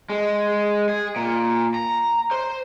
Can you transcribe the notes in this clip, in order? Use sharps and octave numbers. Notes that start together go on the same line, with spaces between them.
G#3
G#4
A#2
A#5
C5